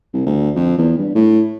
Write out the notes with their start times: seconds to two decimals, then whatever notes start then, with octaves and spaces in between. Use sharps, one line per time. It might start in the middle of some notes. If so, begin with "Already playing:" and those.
0.14 C2
0.26 D2
0.55 F2
0.78 E2
0.98 G2
1.15 A2